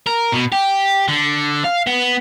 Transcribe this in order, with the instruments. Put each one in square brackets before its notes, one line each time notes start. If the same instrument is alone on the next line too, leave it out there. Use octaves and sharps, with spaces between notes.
[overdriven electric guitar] A#4
B2
G4
D3
F5
B3